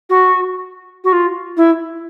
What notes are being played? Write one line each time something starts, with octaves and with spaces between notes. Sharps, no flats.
F#4
F#4
F4
E4